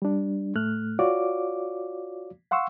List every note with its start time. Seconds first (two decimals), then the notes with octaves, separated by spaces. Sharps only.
0.02 G3 D4
0.55 A2 A3 F6 F#6
0.99 F4 F#4 C#5 D5 F5 D6
2.51 F5 F#5 C6 C#6 E6